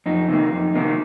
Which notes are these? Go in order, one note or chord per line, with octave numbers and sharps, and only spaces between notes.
F2 D#4
C3 D#3 A#3
F2
C3 D#3 A#3